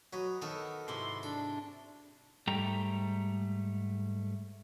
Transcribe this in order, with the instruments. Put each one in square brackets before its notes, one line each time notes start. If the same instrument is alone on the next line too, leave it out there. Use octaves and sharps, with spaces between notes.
[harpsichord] F#3 [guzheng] B4 D#5
[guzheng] D#3 F#4 A4 [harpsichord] B3
[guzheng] G#2 C3 E4 [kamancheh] C6
[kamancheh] D4 [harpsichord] A4
[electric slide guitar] G#2 G3 A3 G5 A#5